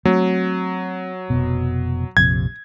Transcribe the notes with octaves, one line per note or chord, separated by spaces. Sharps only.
F#3 A3 C4
F1 B2
A#1 F2 C3 G#6